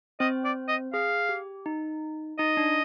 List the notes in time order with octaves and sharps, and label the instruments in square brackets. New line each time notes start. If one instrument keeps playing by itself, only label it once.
[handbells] C4 C5 [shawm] D#5
[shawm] D5
D#5
[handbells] G#4 [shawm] F5
[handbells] G4
D#4
[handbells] D#4 [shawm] D#5
[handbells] D4